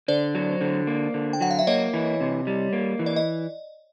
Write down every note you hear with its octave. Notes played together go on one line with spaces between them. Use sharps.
D3 C5 D5
F#3
D3
A#3
D3
G5
F#3 F#5
F5
E5
A#3 C#5 D#5
E3
C3
G3
A#3
E3
D5
D#5